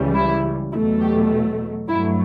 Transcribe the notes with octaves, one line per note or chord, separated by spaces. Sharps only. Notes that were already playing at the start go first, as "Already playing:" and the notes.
Already playing: C#2 C#3 E3 G3
E4
E2 B2 F#3 A3 E4
G4
G2 F#3 A3 E4